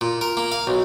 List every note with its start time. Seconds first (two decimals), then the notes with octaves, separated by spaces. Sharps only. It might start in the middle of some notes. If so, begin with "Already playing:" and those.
0.01 A#2
0.21 A#4
0.37 A#3
0.52 F5
0.67 B1